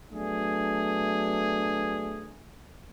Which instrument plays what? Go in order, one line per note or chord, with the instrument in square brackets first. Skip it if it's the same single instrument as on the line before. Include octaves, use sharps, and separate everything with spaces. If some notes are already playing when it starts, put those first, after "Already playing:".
[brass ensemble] F#3 A3 B3 D4 G#4